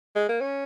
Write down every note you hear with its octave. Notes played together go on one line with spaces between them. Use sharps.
G#3
A#3
C#4